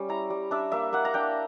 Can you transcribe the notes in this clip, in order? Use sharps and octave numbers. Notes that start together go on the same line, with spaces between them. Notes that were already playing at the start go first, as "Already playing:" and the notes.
Already playing: G3 C#4
E4 A#5
G3
D4 E5
A#3 E5
A#3 F#5
A#5
D4 G5